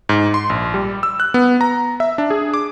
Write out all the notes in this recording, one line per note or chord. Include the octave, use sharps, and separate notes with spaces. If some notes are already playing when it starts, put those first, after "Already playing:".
G#2
C6
A#1
G3
E6
F#6
B3
A#5
E5
D4
G#4
D6